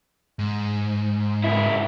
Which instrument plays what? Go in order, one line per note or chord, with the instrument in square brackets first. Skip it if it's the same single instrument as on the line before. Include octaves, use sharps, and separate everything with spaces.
[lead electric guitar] G#2
[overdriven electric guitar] C#2 E4